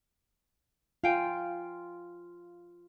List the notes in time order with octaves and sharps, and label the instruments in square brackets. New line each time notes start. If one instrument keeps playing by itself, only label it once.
[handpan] F4 [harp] F5 G5 G#5